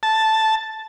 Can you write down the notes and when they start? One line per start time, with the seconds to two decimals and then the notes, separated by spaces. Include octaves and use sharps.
0.03 A5